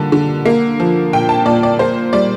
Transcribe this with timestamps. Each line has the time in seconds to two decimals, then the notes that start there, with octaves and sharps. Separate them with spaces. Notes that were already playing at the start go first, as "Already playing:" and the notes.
Already playing: D3 G3 A#3 A5
0.12 D3
0.46 A#3
0.80 F3
1.13 A#2 G5
1.29 A5
1.46 A#2 D5
1.63 D5
1.79 A#3 C5
2.13 G3 D5